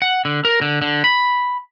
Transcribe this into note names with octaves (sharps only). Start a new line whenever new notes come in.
F#5
D3
A#4
D3
D3
B5